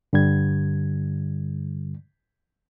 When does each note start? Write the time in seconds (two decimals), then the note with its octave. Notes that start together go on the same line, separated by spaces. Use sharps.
0.13 G2 D3 G3 G#6